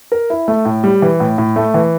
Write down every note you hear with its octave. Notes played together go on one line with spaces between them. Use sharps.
A#4
E4
A3
A2
G3
E3
A2
A2
A3
E3